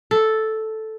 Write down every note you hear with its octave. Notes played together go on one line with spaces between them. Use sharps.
A4